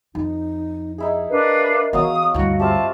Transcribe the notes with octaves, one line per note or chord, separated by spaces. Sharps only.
F2 D#4
D#4 E4 G#4
D4 A#4 B4 F5
E3 F#3 B3 C#4 F5 D#6
D2 G2 E4 F#4
C4 C#4 F4 G4 E5 A5